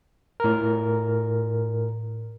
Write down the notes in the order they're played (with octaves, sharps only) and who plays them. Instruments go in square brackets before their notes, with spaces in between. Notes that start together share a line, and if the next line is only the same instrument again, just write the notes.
[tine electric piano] A2 A#4